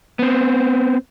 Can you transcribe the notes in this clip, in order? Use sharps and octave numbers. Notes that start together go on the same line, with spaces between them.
B3 C4